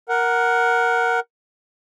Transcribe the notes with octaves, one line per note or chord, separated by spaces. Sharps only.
A#4 F#5